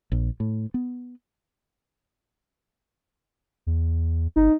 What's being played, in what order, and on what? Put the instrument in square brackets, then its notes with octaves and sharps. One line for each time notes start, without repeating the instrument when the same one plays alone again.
[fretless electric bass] A#1
A2
B3
[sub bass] E2
[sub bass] G1 [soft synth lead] D#4